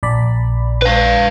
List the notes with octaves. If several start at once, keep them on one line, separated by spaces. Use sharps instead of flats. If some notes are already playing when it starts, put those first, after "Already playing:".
A#1 D5 B5
B4 F5